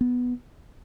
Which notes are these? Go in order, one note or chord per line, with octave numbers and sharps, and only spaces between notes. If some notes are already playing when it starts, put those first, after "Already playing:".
B3